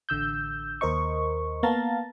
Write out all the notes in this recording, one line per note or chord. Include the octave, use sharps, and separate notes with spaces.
A1 D3 E6 G6
D#2 A#4 C5 D#5 C#6
A#3 B3 F5 A5 A#5 A6